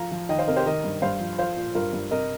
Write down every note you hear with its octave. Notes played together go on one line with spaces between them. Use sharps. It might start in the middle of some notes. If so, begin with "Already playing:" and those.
Already playing: F3 F5 A#5
F3
D#3 D#5 G5
C5 F5
C3 A#4 D#5
G4 C5
D#3 A#4 D#5
G2
G2 C5 F5
F3
F3 C5 F5
A#2
G2 F4 A#4
G2
C3 A#4 D#5